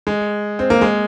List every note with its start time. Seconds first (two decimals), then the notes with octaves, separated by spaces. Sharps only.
0.07 G#3
0.59 C4
0.70 A#3
0.81 G#3